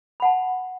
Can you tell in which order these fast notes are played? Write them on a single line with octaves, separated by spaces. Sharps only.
B5 F#5 A5